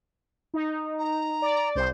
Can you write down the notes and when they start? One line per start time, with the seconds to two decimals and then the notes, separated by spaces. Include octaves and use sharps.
0.54 D#4
0.99 A#5
1.42 D5
1.75 C2 C5